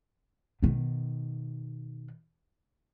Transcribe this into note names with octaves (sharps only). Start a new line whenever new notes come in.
B2 D#3